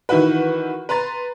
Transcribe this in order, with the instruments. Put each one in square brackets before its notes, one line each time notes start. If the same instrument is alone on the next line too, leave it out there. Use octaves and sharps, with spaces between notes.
[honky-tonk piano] D#3 E3 E4 F#4 B4
B4 A#5 C6 A6